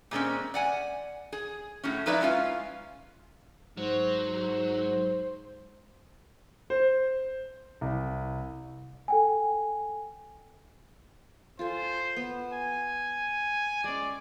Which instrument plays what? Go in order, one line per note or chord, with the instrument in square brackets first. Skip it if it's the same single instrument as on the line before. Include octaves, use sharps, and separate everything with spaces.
[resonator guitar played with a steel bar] A#2 G#3 C4 C#4
D5 F#5 G#5
G#4
A2 F#3 C#4
F3 D#4 E4 B4 D5 E5
G#3 C#4 F4 F5
[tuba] G#2 [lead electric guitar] F#3 [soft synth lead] C5
[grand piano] C5
C2
[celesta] A4 G5 G#5
[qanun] F4 A4 G#5 [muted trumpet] C5
[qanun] B3
[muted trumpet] G#5
[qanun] G#3 C#4 [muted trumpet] D5